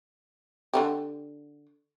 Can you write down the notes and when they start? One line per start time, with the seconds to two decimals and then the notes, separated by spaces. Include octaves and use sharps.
0.74 D3 D#3 G4